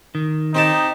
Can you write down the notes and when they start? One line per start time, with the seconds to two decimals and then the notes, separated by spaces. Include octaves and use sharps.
0.15 D#3
0.55 C4 D#4 G4 A5